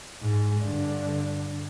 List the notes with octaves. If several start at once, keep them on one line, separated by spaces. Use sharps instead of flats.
G#2
G2 D3